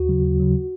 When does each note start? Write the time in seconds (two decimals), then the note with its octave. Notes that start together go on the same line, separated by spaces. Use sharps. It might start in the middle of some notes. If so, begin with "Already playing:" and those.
Already playing: D#2 F#4
0.09 C#3 F#3
0.24 D#2
0.40 C#3 F#3